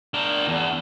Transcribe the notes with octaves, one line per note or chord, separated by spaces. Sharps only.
D4 A#4
E2